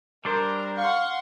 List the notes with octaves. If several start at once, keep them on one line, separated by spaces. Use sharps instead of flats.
G3 D4 A#4 C5
F5 F#5 C6 C#6